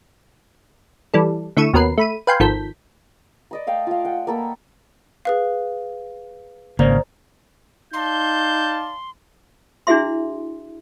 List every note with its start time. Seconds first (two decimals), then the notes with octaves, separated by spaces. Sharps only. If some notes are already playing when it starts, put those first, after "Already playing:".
1.14 E3 G3 A4
1.57 D3 A3 E4 C#6 D#7 E7
1.73 D#2 B2 C#4 A#4 B4 C7
1.98 A3 B5 D#7
2.27 B4 F5 G5 G#5 C6
2.40 G#1 D#3 F3 A4 G6 B6
3.51 D5 D#5 B5
3.67 A3 F5 G5
3.87 F4 F5
4.04 F#5 G5
4.27 A#3 A4 B5
5.25 G#4 B4 F5
6.79 G#1 C#3 A#3 C5 D5 A#5
7.93 D#4 D5 F5 A5 C6 G6
9.87 D4 E4 F#4 G#4 E5 C6